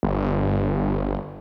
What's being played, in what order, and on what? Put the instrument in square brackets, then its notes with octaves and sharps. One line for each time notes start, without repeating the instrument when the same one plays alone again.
[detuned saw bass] G1